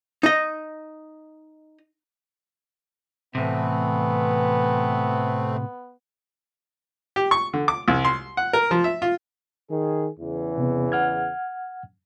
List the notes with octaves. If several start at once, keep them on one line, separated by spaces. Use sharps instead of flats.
D#4 D#5
A2 C3 E3 A3 B3 C4
G4
C#6
D3
D6
C2
C6
F#5
A#4
F3
E5
F4
D#3 G#4
E2 C#3 E3
C3 B3
F#5 F6 G#6